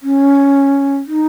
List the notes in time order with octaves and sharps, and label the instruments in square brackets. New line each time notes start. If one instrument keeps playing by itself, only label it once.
[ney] C#4
D#4